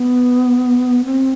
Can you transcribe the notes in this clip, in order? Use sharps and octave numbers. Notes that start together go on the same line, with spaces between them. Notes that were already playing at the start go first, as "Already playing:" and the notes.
Already playing: B3
C4